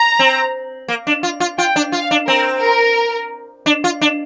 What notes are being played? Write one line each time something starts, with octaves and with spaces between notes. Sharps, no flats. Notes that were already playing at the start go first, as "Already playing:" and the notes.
Already playing: A#5
C4
A#3
D4
F4
F4
F4 G5
D4
F4 F5
D4
C4 A#4
A#4
D4
F4
D4